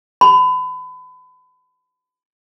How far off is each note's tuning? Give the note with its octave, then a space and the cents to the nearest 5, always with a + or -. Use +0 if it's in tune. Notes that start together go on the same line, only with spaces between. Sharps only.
B5 +30